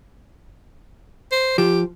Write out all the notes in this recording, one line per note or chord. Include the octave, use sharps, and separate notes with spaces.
C5
F3 G4